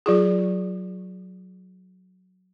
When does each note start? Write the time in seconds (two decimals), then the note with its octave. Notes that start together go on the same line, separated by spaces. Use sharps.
0.06 F#3 F4 G#4